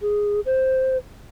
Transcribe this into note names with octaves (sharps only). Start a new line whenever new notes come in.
G#4
C5